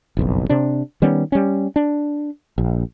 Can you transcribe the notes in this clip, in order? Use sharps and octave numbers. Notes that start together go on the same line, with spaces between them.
F#1 B1 F2
C3 D4
D#3 G3 B3 C#4
G3 C#4
D4
A#1